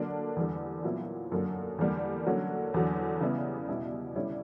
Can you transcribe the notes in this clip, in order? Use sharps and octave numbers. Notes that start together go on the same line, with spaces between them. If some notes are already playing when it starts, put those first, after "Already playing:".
Already playing: D3 F#3 A#3 D4
E2 D3 G3
A#2 F#3 B3 E4
F#2 D3 F#3 A#3
E2 D3 G3 A#3
D3 F#3 A#3 C#4
E2 D3 F#3
C#3 G3 B3 E4
B2 G3 B3 E4
D3 G3 C#4 E4